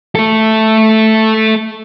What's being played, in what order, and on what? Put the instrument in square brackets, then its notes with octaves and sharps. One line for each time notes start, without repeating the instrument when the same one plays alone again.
[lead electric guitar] A3 A4